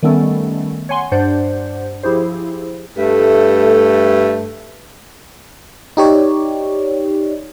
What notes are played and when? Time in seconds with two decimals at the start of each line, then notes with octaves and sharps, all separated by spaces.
0.03 D#3 G3 A3 B3 C#4 A4
0.89 C#5 F#5 G#5 C6 C#6
1.12 G2 D4 C5 D5 F#5 G6
2.03 F3 E4 G4 G#4 C5
2.97 G2 A3
5.97 D#4 G4 C#5 D5